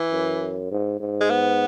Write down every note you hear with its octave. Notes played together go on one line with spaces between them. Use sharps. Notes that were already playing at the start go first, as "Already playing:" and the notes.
Already playing: E3
F#2
G#2
G#2
G#3
B3